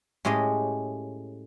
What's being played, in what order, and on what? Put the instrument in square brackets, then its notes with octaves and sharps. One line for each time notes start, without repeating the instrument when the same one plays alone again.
[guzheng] A2 G#3 C#4 G4 D#5